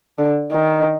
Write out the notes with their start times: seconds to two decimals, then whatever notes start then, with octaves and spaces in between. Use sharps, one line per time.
0.18 D3
0.52 D#3